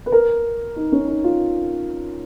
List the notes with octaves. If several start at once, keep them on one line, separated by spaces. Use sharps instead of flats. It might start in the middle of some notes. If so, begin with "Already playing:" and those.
B4
A#4
D#4
C#4
D#4
F4